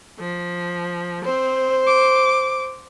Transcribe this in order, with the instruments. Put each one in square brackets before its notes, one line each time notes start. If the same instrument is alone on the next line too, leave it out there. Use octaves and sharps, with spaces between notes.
[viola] F3
[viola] C4 [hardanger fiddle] C5
[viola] D6